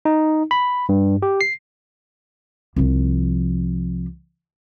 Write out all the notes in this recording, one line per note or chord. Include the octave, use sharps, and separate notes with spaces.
D#4
B5
G2
G4
C7
C2 F3